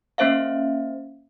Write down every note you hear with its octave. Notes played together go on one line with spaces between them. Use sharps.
A#3 C#4 C5 E5 F5